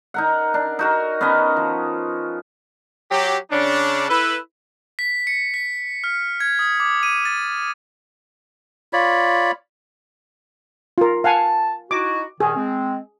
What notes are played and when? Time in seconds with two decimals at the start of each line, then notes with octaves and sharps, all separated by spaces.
0.14 D#4 A#4 F#5
0.54 D4
0.79 D#4 F#4 A#4
1.21 B3 C#4 A#4 D#5
1.57 F3
3.10 F#3 G4
3.51 C#3 C#4 D4
4.09 E4 A4 B4
4.99 B6
5.27 C#7
5.54 B6
6.04 F6
6.40 G#6
6.59 D#6
6.80 D6
7.03 D#7
7.25 A6
8.93 F4 C#5 D5 B5
10.98 F4 A#4
11.24 F5 F#5 G#5 A5
11.91 D#4 E4 F#4 D6
12.40 G2 A#2 D#3 G#4
12.56 G#3 C4